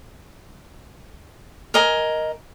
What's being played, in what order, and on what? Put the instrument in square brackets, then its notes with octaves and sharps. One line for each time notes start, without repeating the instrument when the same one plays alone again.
[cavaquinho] A#4 D#5 G#5